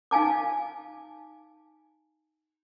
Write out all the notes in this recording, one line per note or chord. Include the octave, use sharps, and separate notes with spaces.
D#4 F5 G#5 A5 D6